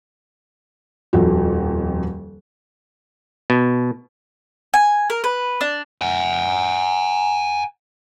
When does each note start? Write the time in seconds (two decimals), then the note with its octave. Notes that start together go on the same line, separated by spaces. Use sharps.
1.13 D#1 F2 F#4
3.50 B2
4.74 G#5
5.10 A#4
5.24 B4
5.61 D4
6.01 F#5 G#5